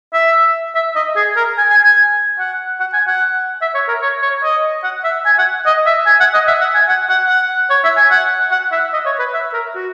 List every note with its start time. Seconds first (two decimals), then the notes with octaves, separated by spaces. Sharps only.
0.14 E5
0.75 E5
0.96 D#5
1.16 G#4
1.36 A#4
1.58 G#5
1.70 G#5
1.84 G#5
2.39 F#5
2.80 F#5
2.93 G#5
3.07 F#5
3.62 E5
3.75 C#5
3.88 A#4
4.02 C#5
4.22 C#5
4.44 D#5
4.84 F#5
5.04 E5
5.26 G#5
5.38 F#5
5.66 D#5
5.86 E5
6.06 G#5
6.20 F#5
6.34 D#5
6.48 E5
6.61 F#5
6.75 G#5
6.89 F#5
7.09 F#5
7.29 F#5
7.70 C#5
7.84 E5
7.97 G#5
8.11 F#5
8.51 F#5
8.72 E5
8.93 D#5
9.06 C#5
9.19 B4
9.34 E5
9.53 A#4
9.75 F#4